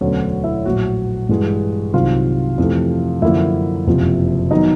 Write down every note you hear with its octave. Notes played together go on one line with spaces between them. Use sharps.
E1 D2 D3 F#3 B3 C#4 C#5
E4 E5
A#1 A2 F#3 F#4 F#5
G2 E3 G#3
C2 C3 D#3 F#3 F4 F5
F2 C3 E3 A3
F#2 D3 F3 A#3 E4 E5
F#1 F2 C3 F3
D#3 F#3 B3 D#4 D#5